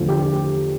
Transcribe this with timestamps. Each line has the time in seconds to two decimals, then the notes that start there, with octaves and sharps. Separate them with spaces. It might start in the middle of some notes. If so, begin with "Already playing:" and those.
Already playing: E2 D3 F3 A3
0.09 G4
0.23 G4